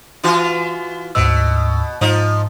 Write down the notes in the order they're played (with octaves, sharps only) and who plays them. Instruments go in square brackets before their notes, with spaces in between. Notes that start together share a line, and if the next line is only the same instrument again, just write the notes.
[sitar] E3 F4 F#4
[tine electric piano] D2 G#2 E6 [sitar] B2
[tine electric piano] G#2 [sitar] F3 D#4